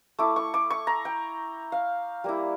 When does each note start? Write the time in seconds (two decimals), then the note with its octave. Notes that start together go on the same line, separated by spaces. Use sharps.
0.19 A3 E4 D6
0.36 C#6
0.54 D6
0.70 C#6
0.87 A#5
1.05 G5
1.72 F5
2.24 G3 A#3 E4